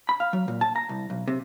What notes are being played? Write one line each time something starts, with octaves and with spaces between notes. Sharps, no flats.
B5
F5
F#3
A#2
A5
A#5
C2
B1
C3